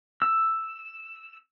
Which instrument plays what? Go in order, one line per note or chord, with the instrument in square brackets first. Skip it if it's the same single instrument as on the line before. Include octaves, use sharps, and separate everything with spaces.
[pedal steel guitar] E6